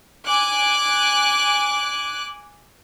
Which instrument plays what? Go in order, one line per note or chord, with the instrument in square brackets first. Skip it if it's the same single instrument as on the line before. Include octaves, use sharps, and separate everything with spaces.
[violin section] G#5 D6 F#6